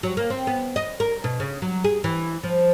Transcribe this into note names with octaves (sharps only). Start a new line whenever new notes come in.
F#3
A#3
C4
B3
D#5
A#4
B2
C#3
F#3
G#4
E3
F3